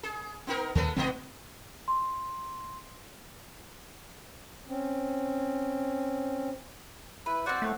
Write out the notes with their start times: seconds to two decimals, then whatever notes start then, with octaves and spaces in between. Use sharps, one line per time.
0.03 G#4
0.47 B3 D#4 A#4
0.75 D#2 G#3 A4 B4
0.96 A1 G#2 C#3 B3 C4 D#5
1.88 C6
4.67 C4 C#4
7.26 E4 B4
7.46 C4 F#4 C5 D5 F#5
7.62 A2 A3